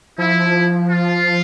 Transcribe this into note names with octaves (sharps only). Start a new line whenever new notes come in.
F3 E4
F4